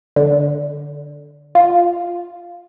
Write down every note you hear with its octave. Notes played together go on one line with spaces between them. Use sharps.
D3
F4